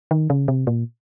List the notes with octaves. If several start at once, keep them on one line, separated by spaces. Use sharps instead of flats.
D#3
C#3
C3
A#2